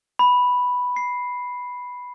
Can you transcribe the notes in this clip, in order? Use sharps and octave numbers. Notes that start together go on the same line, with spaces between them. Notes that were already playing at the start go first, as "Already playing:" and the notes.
B5
C7